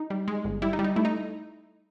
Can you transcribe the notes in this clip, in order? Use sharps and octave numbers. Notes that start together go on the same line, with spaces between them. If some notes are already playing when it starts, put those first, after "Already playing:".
Already playing: D#4
G3
G#3
G1
G3 E4
D#4
G3
D#4
A3 E4
D#4